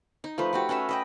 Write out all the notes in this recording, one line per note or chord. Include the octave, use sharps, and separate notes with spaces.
D#4
F3 A3 B4
A3 F#4 G4
C#4 F#4 B4 E5
B4 D#5 G5